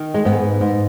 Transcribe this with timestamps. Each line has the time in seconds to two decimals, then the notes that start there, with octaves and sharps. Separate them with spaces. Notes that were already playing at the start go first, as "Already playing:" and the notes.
Already playing: D#3
0.14 G#3
0.25 G#2 B3
0.61 G#2